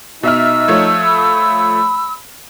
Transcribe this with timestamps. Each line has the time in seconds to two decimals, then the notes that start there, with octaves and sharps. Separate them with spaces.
0.23 B2 D#4 E5 E6 F6
0.68 F3 A3 C#5
1.06 B5